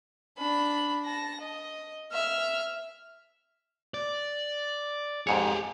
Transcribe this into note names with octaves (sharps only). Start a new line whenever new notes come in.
D4 B5
A5 A#6
D#5
E5 F6
D5
F2 G#2 G4 G#4 C#5